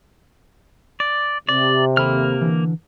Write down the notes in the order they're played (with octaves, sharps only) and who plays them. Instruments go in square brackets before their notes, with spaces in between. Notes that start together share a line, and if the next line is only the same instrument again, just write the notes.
[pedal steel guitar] D5
[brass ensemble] C3 [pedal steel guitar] D5
[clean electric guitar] D#2 A4 B5 [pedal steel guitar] A#3 F6
[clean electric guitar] D3 E3